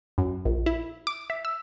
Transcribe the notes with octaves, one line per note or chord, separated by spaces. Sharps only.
F#2
A#1
E4
D6
E5
E6